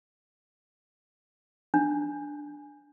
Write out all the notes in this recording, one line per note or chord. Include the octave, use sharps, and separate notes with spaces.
D4